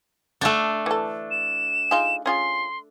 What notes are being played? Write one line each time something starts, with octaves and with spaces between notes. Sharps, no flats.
D3 A3 D4 F#4 A4
E3 A4
E7
D#4 F4 G#4
C#4 F4 G#4 C6